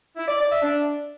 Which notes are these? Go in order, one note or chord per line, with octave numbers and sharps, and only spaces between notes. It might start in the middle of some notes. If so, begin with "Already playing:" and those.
E4
D5
D5
E5
D4